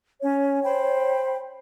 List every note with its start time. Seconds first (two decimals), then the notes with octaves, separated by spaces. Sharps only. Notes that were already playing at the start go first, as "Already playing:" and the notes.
0.21 C#4 C#5
0.64 C5 G5 B5